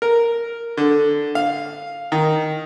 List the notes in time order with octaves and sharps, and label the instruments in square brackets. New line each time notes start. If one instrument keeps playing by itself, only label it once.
[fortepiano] A#4
D3
F5
D#3